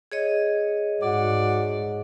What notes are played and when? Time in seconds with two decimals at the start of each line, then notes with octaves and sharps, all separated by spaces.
0.12 G#4 C#5 D#5
1.02 G#2 F#4 D5 F#5